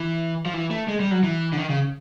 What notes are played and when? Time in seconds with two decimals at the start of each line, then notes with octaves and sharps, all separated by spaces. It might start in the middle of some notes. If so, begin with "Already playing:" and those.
Already playing: E3
0.46 F3
0.54 E3
0.71 A3
0.88 G#3
1.00 G3
1.11 F#3
1.23 E3
1.53 D3
1.57 D#3
1.70 C#3